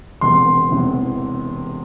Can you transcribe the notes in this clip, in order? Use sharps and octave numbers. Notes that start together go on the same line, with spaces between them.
E1 E2 C3 C6
E1 E2 C3